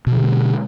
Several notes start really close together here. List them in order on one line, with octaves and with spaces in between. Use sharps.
B2 F3 D3 G#3